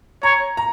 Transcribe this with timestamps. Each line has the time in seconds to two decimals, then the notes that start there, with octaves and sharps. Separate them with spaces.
0.23 C#5 A#5
0.57 A#5